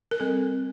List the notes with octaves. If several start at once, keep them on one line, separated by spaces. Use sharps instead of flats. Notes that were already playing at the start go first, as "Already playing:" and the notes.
A#4
G3 C4 A4